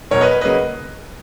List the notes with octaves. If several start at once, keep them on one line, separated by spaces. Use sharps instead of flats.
B1 B2 F#3 A#4 C#5
B4 D#5
B4
C#3 F#3 A#3 B4 D#5